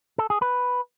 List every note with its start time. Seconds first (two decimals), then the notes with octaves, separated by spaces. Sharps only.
0.18 A4
0.30 G#4
0.42 B4